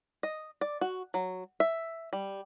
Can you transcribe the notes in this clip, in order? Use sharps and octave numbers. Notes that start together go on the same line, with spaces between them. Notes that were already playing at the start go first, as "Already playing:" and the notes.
D#5
D5
F#4
F#3
E5
G3